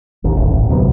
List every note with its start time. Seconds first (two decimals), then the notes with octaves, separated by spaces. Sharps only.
0.24 A1 D#2
0.36 D1 A1
0.52 E1 A1
0.69 D2 C3 F#3 B3